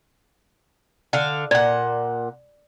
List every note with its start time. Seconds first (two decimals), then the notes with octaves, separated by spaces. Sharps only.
1.13 D3 F5
1.51 A#2 D5 F#5